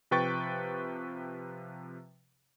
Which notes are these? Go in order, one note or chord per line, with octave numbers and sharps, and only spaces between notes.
C3 F3 B4 G5 C#6 A6